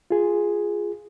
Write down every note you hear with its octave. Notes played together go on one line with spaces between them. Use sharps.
F4 G#4